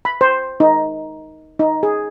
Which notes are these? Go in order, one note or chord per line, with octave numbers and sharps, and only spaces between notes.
B5
C5
D#4
D#4
G#4